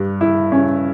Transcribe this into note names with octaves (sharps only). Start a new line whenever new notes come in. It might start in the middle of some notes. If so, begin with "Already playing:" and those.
Already playing: G2 G3
E4
C#4